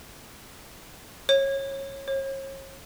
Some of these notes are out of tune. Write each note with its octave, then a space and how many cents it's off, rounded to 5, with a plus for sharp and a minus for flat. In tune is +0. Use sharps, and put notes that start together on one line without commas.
C#5 -20
C#5 -40